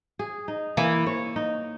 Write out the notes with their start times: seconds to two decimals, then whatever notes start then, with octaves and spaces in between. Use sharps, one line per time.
0.19 G#4
0.48 D#4
0.77 E3 A#3
1.07 C#5
1.36 D#4